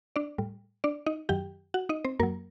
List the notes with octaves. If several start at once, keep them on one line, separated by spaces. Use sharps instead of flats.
D4 D5
A2 G3
D4 D5
D#4 D#5
F#2 D#3 F#3 G4 G5
F#4 F#5
D#4 D#5
C4 C5
F#2 F#3 A#3 A#4